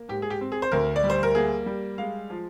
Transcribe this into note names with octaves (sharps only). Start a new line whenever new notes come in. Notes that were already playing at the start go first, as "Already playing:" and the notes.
Already playing: A#3
G#2 G4
G#4
G4
C4
G#4
C5
D2 A#4
D5
G3
C5
A#4
A#3 G#4
G3
G#3 F5
F3